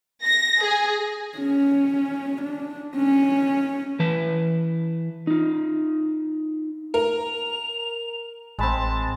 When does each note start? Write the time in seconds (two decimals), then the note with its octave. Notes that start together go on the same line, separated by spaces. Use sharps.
0.24 A#6
0.63 G#4
1.38 C#4
2.42 D4
2.96 C#4
4.00 E3 B4 A5
5.27 D#4 F4
6.94 A#4 F7
8.59 A1 G#3 C4 A5 B5